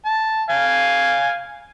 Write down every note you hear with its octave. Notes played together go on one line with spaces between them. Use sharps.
A5
F5 G#5